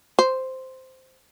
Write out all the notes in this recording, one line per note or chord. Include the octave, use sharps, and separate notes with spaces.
C5